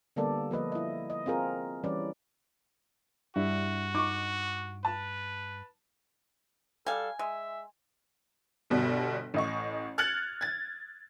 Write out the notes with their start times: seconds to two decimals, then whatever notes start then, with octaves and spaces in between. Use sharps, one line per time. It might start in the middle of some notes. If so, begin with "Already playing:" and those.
0.16 D3 G3 A#3 B3 A4 D5
0.51 F3 A#3 B4 D#5
0.72 E4 D#5
1.10 D#5
1.26 C4 F4 G#4 A#4
1.84 E3 G3 C#4 B4 D5
3.36 G2 G3 D4 E4 F#4
3.95 D#4 C#6 D6
4.85 B4 A5
6.86 G3 A4 F5 G#5
7.19 G#3 E5
8.70 G1 B2 G3
9.34 A1 D#5 C#6
9.98 F6 F#6 G#6 A6 C#7 F#7
10.41 G#6 A6